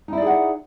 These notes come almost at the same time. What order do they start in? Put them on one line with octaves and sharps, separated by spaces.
D#4 E4 D5 G#4 F#5